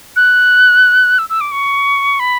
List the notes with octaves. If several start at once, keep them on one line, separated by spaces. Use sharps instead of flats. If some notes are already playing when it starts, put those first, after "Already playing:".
F#6
E6
E6
D6
C#6
B5